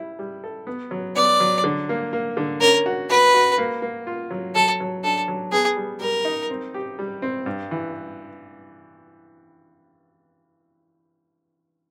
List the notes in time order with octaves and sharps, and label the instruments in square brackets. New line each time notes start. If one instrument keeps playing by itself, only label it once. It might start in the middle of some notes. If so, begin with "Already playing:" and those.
Already playing: [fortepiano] G3 E4
G3
A4
B3
F#3
[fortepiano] B3 [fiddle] D5
[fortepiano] F#3
D3
A#3
A#3
D3
[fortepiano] C#4 [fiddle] A#4
[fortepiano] F#4
[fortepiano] F#4 [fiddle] B4
[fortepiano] F#4
A#3
A#3
F4
F#3
[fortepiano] F#3 [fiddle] A4
[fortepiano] F#3
[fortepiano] D4 [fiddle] A4
[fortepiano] F#3
[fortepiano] B3 [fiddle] G#4
[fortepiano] G3
[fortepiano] G3 [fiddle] A#4
[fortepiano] D#4
C4
G4
G3
C4
G2
E3